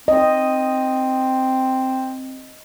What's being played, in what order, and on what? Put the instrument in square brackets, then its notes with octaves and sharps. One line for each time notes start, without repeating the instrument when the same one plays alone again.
[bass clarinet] C4 [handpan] D#5